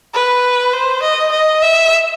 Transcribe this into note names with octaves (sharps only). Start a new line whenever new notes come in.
B4
C5
D#5
D#5
E5